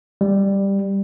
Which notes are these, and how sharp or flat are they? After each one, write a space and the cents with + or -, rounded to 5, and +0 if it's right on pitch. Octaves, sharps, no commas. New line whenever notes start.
G3 +10